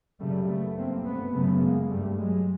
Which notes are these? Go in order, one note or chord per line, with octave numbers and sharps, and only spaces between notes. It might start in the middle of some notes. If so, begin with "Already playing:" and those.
F#2 C#3 G3 A3
A3 B3
G2 A#3 C4
A3 B3
F#2 C#3 A3 B3
G#3 A#3
G2 G3 A3
F#3 G#3